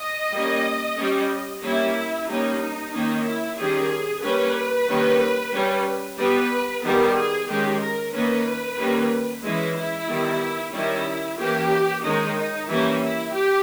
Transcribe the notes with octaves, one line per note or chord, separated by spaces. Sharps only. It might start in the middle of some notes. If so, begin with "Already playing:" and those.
Already playing: D#5
G3 A#3 C#4
G3 C#4
G3 A#3 C#4 E4
G3 A#3 C#4 D#4
D#3 A#3 C#4 D#4
E4
D#3 G3 C#4 G#4
G3 A#3 C#4 B4
D#3 G3 A#3 C#4
G3 C#4
G3 B3 B4
D#3 G3 B3 A#4
G#4
D#3 G#3 C#4 G4
A#4
D#3 A#3 C#4 B4
D#3 G3 A#3 C#4
E3 G#3 C#4 E4
E4
D#3 G3 B3
D#3 G3 C#4 E4
E3 A#3 C#4 G4
D#3 G#3 C#4 D#4
D#4
E3 G3 A#3 C#4 E4
E4
G4